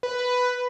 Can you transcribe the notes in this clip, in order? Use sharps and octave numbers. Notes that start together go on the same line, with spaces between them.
B4